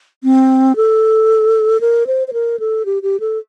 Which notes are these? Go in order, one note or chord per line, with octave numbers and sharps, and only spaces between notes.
C4
A4
A#4
C5
C5
A#4
A4
G4
G4
A4